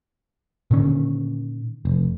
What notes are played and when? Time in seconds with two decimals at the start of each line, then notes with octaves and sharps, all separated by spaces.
0.71 A#2 D3 D#3 C#4
1.85 F1